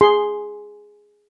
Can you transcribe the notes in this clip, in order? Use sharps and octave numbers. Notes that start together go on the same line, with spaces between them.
G#4 C6